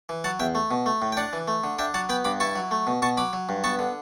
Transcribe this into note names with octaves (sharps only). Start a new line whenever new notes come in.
E3
F#3 F#5 A5
E2 E5 G5
A3
B2
A3
A2
G5
D4 D5 F#5
E3
A3
D3
D4 E5 G5
F#3 F#5 A5
B3 G5 B5
G2 B5 D6
E4 A5 C#6
F#3
A3
B2
B2 A5 C#6
F#3 B5 D6
F#3
G2
B3 A5 C#6
D3